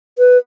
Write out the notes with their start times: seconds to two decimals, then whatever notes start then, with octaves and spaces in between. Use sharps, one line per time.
0.18 B4